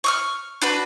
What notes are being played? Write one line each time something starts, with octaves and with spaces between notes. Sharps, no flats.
C#6 D#6 F6
D4 F#4 B4